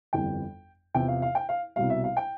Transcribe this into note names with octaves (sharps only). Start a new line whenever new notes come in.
G1 F2 E3 G3 G5
E2 C3 F3 G5
F5
F5
G5
F5
C2 B2 G3 F5
E5
F5
G5